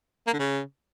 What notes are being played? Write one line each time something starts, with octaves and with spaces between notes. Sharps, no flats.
A#3
D3
C#3